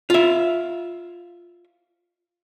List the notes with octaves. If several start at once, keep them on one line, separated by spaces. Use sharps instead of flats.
F4 E5